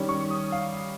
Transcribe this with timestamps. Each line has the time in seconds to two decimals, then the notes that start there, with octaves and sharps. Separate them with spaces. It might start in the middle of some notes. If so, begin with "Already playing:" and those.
Already playing: D#3 G3 C#4
0.09 C#6
0.30 D#6
0.52 F5